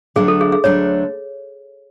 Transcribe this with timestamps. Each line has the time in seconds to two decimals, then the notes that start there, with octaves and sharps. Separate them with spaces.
0.16 D2 D3 F#3 A3 D4 G#4
0.28 A4
0.41 G#4
0.52 G#4
0.64 D2 D3 F#3 A3 D4 C#5